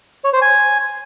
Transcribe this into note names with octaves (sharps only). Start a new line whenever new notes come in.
C#5
C5
G#5